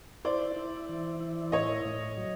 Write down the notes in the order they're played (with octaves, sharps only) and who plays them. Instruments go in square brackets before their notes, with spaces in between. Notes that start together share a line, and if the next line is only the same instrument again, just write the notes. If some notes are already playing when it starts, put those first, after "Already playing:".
[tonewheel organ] E4 [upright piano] C5 D5
[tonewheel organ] E4
E3
E4
[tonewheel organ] A2 [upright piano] C#5 D#5
[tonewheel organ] A2
F#3